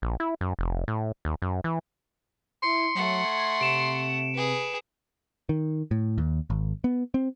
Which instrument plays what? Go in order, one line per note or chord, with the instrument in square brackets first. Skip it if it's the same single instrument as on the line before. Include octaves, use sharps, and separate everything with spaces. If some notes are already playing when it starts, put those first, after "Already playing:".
[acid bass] A#1
E4
F#2
F1
A2
D#2
F#2
E3
[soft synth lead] E4 [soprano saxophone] C6 [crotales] C#7
[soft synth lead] F#3 [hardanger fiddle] A3 F#5
[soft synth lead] G#6
[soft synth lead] C3 [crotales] D7 E7
[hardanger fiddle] G#4 B4
[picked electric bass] D#3
A2
D#2
G#1
B3
C4